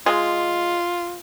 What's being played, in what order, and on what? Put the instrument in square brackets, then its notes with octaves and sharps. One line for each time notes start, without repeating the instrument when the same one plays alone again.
[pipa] G#3 [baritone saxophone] F4